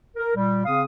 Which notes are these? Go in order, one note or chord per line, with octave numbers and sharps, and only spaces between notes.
A#4
A#2 G3
C#3 C4 F5 D#6